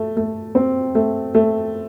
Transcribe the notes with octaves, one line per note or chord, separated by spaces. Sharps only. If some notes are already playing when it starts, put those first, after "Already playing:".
Already playing: A3
A3
C4
A3
A3